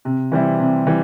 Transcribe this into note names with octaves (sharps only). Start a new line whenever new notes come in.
C3
E3 G3 C4 E4
C3
E3 G3